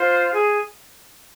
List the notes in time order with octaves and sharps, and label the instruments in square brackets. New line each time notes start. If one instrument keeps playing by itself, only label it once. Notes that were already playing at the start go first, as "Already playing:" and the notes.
Already playing: [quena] F4 [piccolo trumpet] C5
[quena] G#4